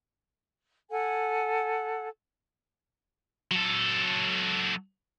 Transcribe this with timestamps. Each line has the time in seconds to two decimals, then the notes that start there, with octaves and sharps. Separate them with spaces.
0.91 A4 F#5 G#5
3.51 F#3 A4